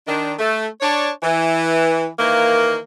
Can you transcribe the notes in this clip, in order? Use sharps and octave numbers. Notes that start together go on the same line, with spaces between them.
D#3 D4
A3
D4 C#5
E3
D#3 E3 A#3